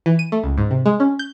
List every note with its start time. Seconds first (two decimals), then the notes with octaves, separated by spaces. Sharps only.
0.06 E3
0.19 D#7
0.32 A3
0.44 C#2
0.58 G#2
0.71 C3
0.86 G#3
1.00 C#4
1.19 G6